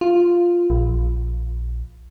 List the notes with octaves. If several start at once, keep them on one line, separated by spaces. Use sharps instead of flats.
F4
A#1